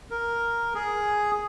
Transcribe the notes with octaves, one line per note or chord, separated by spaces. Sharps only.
A#4
G#4